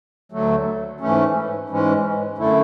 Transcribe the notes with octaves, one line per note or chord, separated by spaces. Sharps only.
D2 D3 F#3 A3
G#2 E3 A3 C#4
G#2 E3 G#3 C#4
F#2 D3 A3 E4